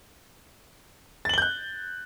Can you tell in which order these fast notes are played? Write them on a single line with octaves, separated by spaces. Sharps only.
A6 F#7 G7 G6 F#6